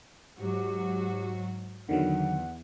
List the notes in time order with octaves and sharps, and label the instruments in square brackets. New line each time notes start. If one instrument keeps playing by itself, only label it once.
[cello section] G#2 F#3 F#4 [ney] G4
[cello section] E2 [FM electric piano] D3 D#3 F#3 [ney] F#5